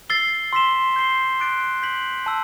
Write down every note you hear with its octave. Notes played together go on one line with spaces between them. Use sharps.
E6 A6 C7 G7
C6 E6 B6 E7 G7
G6 C7 G7
D6 F#6 A6 D7
G6 B6 F#7
A5 E6